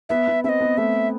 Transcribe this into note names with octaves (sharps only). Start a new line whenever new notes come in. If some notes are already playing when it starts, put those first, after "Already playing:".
B3 E5
B3
C4 D#5 E5
B3
A3 E5